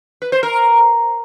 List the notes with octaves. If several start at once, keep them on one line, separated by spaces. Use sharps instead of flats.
B4
C5
A#4